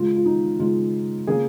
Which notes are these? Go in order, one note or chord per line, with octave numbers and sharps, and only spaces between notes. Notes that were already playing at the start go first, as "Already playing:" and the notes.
Already playing: C#3 G#3 F4
F4
D#4
C#3 G#3 F4
C#3 A#3 G#4